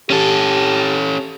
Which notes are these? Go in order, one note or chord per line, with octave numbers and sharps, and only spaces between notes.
C#4 G4 A4